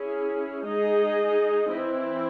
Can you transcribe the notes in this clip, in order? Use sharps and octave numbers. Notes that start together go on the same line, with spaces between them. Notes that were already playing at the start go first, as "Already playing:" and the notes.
Already playing: C#4 E4 G#4
G#3 D#4 G#4 D#5
E3 C4 E4